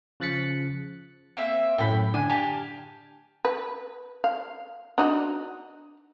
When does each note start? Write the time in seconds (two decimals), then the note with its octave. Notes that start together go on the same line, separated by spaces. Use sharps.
0.20 C#3 F3 F#6 A6 B6 C#7
1.37 A#3 C4 E5
1.78 F#2 A2 G5 B5
2.14 D3 D4 G#5
2.30 G4 F5 G#5 A5
3.45 B4
4.24 F5
4.98 D4 D#4 F#4